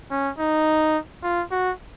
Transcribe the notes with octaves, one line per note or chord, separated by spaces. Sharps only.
C#4
D#4
F4
F#4